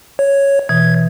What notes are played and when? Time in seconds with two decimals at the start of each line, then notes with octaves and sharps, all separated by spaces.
0.19 C#5
0.69 B2 E3 G#6